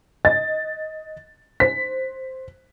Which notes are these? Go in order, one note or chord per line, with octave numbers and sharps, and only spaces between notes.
D#5 A6
C5 B6